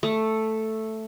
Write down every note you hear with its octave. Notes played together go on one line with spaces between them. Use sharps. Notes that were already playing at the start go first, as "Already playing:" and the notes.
A3